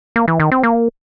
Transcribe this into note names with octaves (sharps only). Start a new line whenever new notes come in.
A#3
E3
D#3
C4
A#3